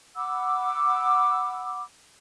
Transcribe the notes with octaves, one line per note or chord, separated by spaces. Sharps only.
F#5 B5 D6 E6